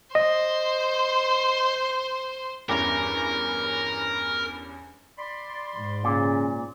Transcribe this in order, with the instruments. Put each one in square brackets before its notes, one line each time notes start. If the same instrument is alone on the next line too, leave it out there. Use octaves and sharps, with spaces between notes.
[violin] C5 C6 [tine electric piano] D#5
[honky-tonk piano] E2 G2 C#4 [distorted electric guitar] A#4
[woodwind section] D5 B5 C6
[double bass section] G#2
[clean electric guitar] A#2 [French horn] C#3